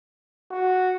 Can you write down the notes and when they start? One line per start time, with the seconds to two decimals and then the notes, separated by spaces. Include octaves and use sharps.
0.51 F#4